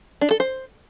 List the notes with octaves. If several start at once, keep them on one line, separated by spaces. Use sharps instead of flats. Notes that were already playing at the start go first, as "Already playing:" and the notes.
D4
A4
C5